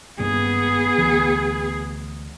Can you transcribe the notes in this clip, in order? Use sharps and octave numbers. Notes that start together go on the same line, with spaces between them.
G#1 G2 A#3 B3 G#4
D2 E3